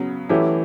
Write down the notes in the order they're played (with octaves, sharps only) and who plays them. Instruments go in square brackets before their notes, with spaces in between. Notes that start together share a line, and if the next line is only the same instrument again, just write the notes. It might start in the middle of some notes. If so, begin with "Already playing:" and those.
Already playing: [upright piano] C#3 F#3 B3
[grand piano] E3 [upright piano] F#3 A3 C#4 E4 G4